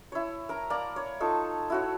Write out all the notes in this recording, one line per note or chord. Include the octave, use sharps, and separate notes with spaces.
E4 C#5
A#4 A#5
A#3 D5 A#5
C#5
D#4 F4 A4 C#6
E4 F#4 C#5